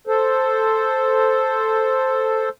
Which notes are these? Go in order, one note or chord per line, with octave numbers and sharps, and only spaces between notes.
A4 C5